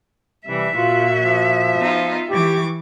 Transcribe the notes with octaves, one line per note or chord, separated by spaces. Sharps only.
C3 E3 G3 E5
A#2 F4 F#4
F3
B3 D#4 F4
E3 G4 C#6 D6